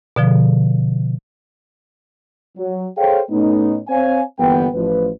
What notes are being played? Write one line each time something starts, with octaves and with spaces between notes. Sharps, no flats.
B2 D3 F3
F#3
G#4 A4 C5 C#5 F5 G5
A2 A3 B3 C#4 D#4
C4 C5 C#5 F5 G#5
G1 E3 A#3 B3 G5
A1 F3 B4